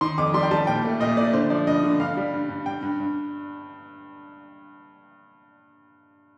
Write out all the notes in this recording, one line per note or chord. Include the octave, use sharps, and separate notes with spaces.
D#3 C6
F2 D6
G3 C6
G5
G3 A5
A#2 G5
A3
A#2 D#5
A3 D5
D3 C5
F3 D5
G2 D#5
D3
G2 F5
G3
G2
G2
G2 G5
G2
G2